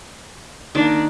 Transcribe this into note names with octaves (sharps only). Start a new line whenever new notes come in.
D#3 A#3 D4